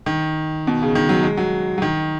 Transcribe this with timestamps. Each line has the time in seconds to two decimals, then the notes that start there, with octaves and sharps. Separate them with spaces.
0.06 D#3
0.67 B2
0.82 C#3
0.95 D#3
1.09 F#3
1.23 G#3
1.37 F#3
1.78 F#3
1.82 D#3